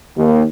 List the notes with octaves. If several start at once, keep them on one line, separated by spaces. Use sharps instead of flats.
D#2